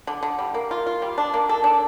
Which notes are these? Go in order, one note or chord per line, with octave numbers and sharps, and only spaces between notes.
D3
D3
G3
A#3
F4
F4
G3
D4
A#3
A4
D4